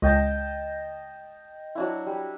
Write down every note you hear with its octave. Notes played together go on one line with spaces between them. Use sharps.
C#2 D#5 G5 A5
F#3 D4 E4
G3